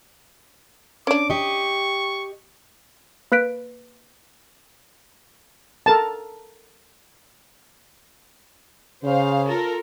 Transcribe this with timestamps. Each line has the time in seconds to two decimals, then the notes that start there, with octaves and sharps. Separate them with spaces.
1.07 C#4 D4 D6
1.30 G4 D#5 C#6
3.32 A#3 B4 F#6 B6 D7
5.86 A4 A#4 A5
9.03 C#3 C5 F5
9.47 F4 A4 A#4